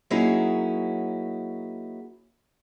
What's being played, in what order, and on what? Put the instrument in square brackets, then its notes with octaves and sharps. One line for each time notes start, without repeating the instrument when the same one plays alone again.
[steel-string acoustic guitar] F#3 A#3 C#4 D#4 E4 G#4